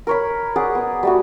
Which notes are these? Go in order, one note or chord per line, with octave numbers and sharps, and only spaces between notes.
A#4 C#5 B5
G#4 D5 F#5
B3
G3 A3 F#4